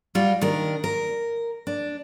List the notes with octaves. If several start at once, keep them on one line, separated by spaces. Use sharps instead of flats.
G3 F4 F#4
D#3 D4 A#4
A#4
D4